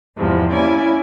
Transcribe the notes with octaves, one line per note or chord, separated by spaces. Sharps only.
E2 G#2 C3 F3
A#3 C#4 E4 D5 G#5